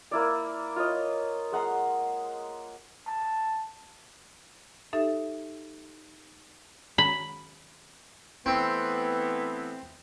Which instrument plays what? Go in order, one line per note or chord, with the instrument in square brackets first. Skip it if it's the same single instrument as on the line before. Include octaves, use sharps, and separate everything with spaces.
[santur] A#3 E4 D5
F4 C#5 D#5
G#3 F#5 A#5 C6
[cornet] A5
[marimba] D#4 G4 A4 E5
[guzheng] B5
[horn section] E3 A3 B3 [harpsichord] C4